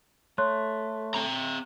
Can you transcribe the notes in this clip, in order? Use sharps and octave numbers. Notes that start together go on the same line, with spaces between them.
A3 C#5 C6 F#6
C4 A#5